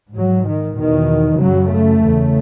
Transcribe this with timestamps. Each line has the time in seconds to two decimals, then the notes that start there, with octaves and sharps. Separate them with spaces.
0.15 G#2 F#3
0.46 D#3
0.77 E2 B2 D#3
1.40 F#2 C#3 F#3
1.71 A3
2.02 E2 C#3